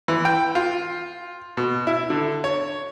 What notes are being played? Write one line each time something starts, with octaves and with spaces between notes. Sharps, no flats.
E3
G5
F4
B2
E4
D3
C#5